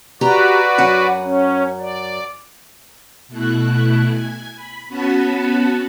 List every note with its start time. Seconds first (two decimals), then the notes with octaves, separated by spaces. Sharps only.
0.21 F#4 G4 B4 D5 A#5
0.78 F#2 F#5 G#5
1.23 C#4
1.80 D5
3.28 B2 A3 E4 F#6
4.06 G#5
4.56 B5
4.87 B3 C#4 F#4 F#5 A5 B5